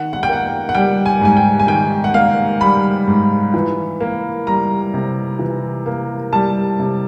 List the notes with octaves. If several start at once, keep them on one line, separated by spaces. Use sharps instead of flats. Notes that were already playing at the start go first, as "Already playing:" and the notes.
Already playing: D#3 F#5
F#5
G5
A#3 F#5
F#5
G3 G5
G#5
G#2 G#5
G5
G#5
D#3 G5
F#5
A#3 F5
G3 B5
G#2
E3
A#3
G3 A#5
C3
E3
A#3
G3 A5
C3